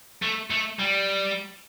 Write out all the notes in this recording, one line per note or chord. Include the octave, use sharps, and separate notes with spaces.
A3
A3
G3